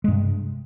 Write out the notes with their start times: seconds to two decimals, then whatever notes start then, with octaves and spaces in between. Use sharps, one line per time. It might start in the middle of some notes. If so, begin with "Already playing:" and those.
0.04 G#3
0.08 G2
0.12 C3